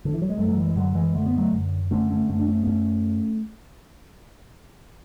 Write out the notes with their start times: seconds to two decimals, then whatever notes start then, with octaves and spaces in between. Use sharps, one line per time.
0.05 D3
0.14 E3
0.22 F#3
0.30 G#3
0.38 F#2 F#3 A3
0.49 F#3
0.57 E3 G#3
0.68 G#3
0.76 F#2 D3 F#3
0.95 E3 G#3
1.15 D3 A3
1.26 B3
1.37 F#3 A3
1.53 F#2
1.91 D3 A3 C#4
2.10 A3 C#4
2.29 F#2 A3 C#4
2.39 D4
2.48 A3 C#4
2.63 B3
2.67 F#2 A3 C#4